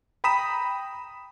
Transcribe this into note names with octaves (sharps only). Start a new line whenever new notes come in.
G5 A#5 B5 D#6 B6 E7